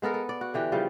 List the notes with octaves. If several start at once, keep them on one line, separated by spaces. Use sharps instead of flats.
G#3 B3 A4 A#4
A4
D5
F#4
D3 E3 G4
C#3 F3 G3